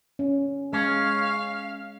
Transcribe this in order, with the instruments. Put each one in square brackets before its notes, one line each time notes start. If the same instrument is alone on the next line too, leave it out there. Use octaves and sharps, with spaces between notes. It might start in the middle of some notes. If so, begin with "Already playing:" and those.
[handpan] C#4
[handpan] G#3 [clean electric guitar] C#4 [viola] F5